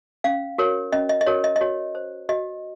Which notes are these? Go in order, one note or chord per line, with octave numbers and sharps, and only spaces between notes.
C#4 F5
F#4 A#4 C#5
C#4 D#5
D#5
D#5
F#4 A#4 C#5
D#5
D#5
F#4 C#5
C5
F#4 D#5